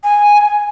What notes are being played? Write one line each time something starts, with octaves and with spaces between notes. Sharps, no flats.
G#5